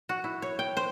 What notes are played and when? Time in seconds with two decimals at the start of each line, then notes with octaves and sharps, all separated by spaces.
0.09 F#4
0.24 E4
0.42 C#5
0.59 G5
0.77 C5